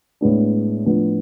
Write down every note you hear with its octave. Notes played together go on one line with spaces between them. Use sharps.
A2 G#3 B3 D4
A2 F3 B3 D4